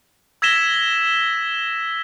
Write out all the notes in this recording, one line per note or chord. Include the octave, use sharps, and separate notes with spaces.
E6 G#6 A#6 B6 E7 G7